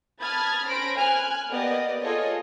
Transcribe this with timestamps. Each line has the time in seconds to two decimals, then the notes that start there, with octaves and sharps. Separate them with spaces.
0.20 A5 B5 D#6 F6 G#6 A6
0.66 C#4 C5 B5 A#6 D7
0.97 G#5 F6 F#6 G#6
1.49 A#3 B3 G4 D5 D#5
2.02 F4 G#4 A4 C5 C#5 D#5